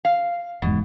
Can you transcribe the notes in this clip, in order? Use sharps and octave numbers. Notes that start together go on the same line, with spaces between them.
F5
F1 E2 G#2 B2